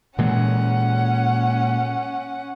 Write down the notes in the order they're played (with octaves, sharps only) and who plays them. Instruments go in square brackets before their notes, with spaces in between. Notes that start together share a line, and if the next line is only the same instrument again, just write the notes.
[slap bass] A#2 E3 G#3 [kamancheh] C#4 F#5